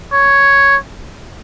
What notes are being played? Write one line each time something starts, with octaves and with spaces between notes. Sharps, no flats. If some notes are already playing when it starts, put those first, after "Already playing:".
C#5